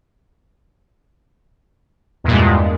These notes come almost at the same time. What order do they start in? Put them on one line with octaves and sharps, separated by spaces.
E2 A#2 G2 G#3